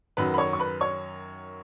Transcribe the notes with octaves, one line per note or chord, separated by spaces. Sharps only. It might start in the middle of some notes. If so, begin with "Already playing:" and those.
F#2 D#3 F#3 B4 B5
B5
C#5 C#6
C#6
B4 B5
C#5 C#6